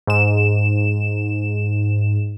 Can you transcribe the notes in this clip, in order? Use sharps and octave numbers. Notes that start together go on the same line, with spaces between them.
G#2 E7